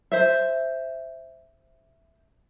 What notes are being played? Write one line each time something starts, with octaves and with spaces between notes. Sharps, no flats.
C5 E5